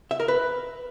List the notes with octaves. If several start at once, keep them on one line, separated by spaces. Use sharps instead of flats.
E5
A#4
B4